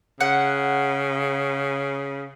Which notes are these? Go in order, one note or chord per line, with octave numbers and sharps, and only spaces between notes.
C#3 F#5